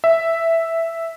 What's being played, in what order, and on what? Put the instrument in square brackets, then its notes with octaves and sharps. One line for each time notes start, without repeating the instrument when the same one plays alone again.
[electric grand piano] E5